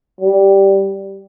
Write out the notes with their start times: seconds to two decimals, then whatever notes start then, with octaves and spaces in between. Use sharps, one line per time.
0.21 G3